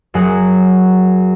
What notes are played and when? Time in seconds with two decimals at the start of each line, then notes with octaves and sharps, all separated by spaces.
0.14 F#2 F#3 G#4 F#5